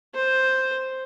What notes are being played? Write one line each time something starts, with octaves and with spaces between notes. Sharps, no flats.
C5